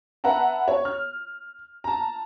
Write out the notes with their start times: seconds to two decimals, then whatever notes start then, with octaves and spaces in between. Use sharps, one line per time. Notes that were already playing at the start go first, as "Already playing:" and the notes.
0.24 B4 E5 F#5 A5 A#5
0.68 C#5
0.85 F6
1.84 A5 A#5